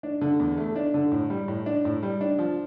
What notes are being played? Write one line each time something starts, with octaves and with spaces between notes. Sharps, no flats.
D4
D3
E2
A3
D4
D3
A2
G3
A2
D4
A2
G3
D4
F3